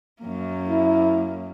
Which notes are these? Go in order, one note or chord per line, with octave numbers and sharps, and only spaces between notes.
F#2 A#3
E4